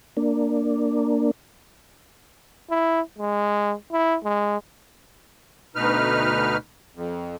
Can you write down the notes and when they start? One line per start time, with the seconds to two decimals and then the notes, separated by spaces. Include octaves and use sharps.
0.17 A#3 D4
2.70 E4
3.18 G#3
3.92 E4
4.24 G#3
5.76 D2 B2 D#4 B4 F6
6.95 F2